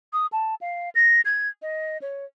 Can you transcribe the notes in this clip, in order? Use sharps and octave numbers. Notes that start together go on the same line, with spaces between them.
D#6
A5
F5
A#6
G#6
D#5
C#5